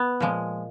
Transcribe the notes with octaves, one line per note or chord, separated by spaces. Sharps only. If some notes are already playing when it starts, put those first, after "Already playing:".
Already playing: B3
A#2 F3 G#3